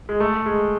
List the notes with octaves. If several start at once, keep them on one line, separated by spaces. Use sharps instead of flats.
G#3
A3
G#3